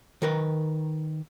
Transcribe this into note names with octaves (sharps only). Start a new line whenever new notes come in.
D#3 A#4 B4